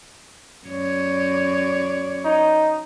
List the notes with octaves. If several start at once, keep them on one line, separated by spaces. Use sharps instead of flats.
F#2 C#5 D5
D#4